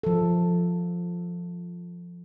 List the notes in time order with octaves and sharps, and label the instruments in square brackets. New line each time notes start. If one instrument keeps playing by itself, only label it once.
[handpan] F3 A4